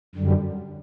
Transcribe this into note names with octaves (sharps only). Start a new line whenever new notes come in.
F#2 D3 G3